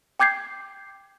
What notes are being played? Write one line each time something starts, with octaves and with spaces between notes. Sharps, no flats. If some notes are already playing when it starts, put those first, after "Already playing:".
G5 D6 G6 G#6 C7